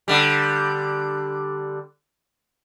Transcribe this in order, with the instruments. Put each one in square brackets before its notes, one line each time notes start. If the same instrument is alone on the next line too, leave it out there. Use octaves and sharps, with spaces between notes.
[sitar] D3 G3